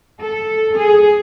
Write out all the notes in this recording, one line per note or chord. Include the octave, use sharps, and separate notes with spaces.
A4
G#4